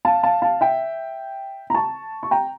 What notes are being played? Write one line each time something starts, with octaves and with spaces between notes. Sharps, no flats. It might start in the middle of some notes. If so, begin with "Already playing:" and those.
F5 A5
F5 A5
F5 A5
E5 G5
A#5
A5 C#6
C#6
G5 A#5